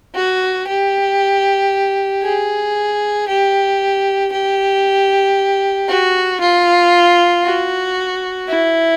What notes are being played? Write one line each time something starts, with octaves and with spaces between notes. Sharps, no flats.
F#4
G4
G#4
G4
G4
F#4
F4
F#4
E4